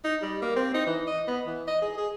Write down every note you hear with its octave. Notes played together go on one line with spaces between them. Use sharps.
D#4
G3
A#3
C4
D#4
E3
D#5
B3
E3
D#5
G#4
G#4